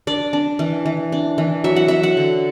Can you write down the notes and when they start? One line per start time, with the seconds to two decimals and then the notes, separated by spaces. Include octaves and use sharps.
0.07 D4 D5
0.33 D4
0.59 E3
0.86 E3
1.12 D4
1.38 E3
1.64 F#3 E5
1.76 F#5
1.88 F#3 E5
2.03 F#5
2.17 D3